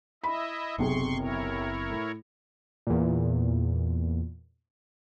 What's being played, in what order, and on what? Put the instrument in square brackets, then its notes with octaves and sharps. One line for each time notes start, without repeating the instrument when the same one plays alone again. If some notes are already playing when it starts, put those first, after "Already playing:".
[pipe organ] E4 D#5 E5 [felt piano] B5
[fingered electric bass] F#1 B3 C4 [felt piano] B1 C3 G#4 [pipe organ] C6 C#6
[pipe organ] E4 A#4 C#5
[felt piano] A2
[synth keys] E2 A#2